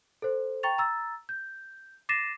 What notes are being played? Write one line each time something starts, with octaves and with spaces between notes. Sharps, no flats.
A4 C5
G5 A#5 C#6 A6 F7
A#5 E6 A6
G6
D6 A6 A#6 C7 D#7 E7